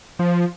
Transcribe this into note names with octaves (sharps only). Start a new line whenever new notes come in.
F3